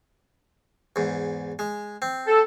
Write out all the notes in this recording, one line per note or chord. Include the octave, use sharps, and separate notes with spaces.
E2 G#2
G#3
C4
A4